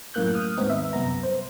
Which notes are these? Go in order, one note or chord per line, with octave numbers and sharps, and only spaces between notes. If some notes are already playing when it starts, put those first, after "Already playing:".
F#2 A2 A#3 F#6 G6
D#6 F6
D#2 G#2 B3 C4 D#4
E5
C2 F#2 B3 A#5
C5